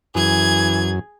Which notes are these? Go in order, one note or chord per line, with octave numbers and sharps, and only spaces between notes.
F#2 E3 G#4 G#6